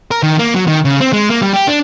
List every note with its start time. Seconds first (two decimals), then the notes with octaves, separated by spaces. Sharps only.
0.11 A#4
0.23 D#3
0.39 A#3
0.55 F#3
0.67 D#3
0.85 C#3
1.01 C4
1.13 G#3
1.30 A#3
1.42 G3
1.54 G4
1.68 D4